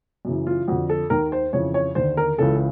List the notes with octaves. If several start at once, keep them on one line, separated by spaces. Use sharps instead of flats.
F#2 C#3 E3
F4
F2 D3 F#4
A4
D#2 D#3 A#4
C5
F2 C#3 E3 C#5
C#5
D#2 D3 C5
A#4
C#2 C#3 E3 A4